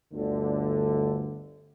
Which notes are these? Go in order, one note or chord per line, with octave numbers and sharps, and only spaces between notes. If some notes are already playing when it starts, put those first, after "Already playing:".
G1 D2 D3